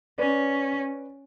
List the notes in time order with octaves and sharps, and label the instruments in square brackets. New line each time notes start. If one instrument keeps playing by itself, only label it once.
[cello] C#4 [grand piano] B4 D5